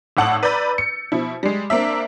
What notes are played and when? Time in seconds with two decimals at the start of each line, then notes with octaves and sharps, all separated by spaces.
0.17 G#1 A2 F#5 A5 E6 F#7
0.43 B4 D5 A#5 B5 G6 A6
0.78 C#7
1.12 B2 F3 E4
1.43 G3 G#3
1.70 A#3 C4 D4 E5